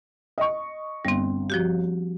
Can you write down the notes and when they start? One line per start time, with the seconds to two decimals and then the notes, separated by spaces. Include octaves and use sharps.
0.38 D#5 C#6
1.05 G1 G3 C4
1.50 F3 F#4 G4